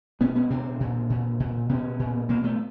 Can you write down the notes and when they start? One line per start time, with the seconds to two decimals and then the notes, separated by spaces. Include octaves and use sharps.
0.21 B2 B3 C#4
0.35 B3 C#4
0.50 B2 C4 D4
0.80 A#2
1.10 A#2
1.40 A#2
1.69 B2 B3 C#4
1.99 A#2
2.29 B2 A#3 C4
2.44 A3 B3